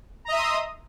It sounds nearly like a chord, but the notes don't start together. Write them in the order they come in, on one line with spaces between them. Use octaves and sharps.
A#5 D#5 E5 D#6 C6